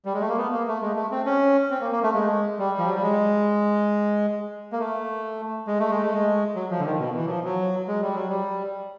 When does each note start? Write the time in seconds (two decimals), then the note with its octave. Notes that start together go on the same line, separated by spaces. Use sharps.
0.05 G3
0.14 G#3
0.21 A3
0.29 A#3
0.37 B3
0.53 A#3
0.67 A3
0.82 G#3
0.96 A3
1.11 C4
1.26 C#4
1.70 C4
1.81 A#3
1.92 A#3
2.03 A3
2.14 G#3
2.59 G3
2.78 F3
2.86 F#3
2.95 G3
3.03 G#3
4.72 A#3
4.79 A3
5.67 G#3
5.79 A3
5.91 G#3
6.02 A3
6.13 G#3
6.55 F#3
6.70 F3
6.79 D3
6.85 D#3
7.00 B2
7.15 E3
7.26 F#3
7.29 F3
7.44 F#3
7.88 G#3
8.02 G3
8.15 F#3
8.29 G3